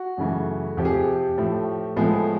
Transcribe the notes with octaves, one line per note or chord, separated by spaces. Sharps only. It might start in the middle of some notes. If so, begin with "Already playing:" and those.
Already playing: F#4
F#2 C#3 E3 A3
F2 C3 F3 G4
G#4
G4
A2 F3 A3
A2 F3 G#3 B3 G#4
A4
G#4